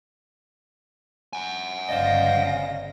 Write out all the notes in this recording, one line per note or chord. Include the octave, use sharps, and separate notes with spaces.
F#5 G#5
G1 C#3 C5 D5 D#5 F5 A#6